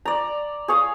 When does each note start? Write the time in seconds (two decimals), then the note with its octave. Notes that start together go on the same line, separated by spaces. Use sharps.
0.05 D5 A#5
0.68 G#4 C#5 F5